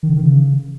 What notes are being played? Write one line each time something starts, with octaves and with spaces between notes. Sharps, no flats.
D#3
D3
D#3
C#3